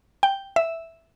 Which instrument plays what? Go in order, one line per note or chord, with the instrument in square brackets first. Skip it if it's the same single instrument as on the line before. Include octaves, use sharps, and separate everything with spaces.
[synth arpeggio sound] G5
E5